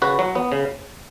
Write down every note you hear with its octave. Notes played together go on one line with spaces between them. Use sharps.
C#3 F#4 B4
F#3
B3
C#3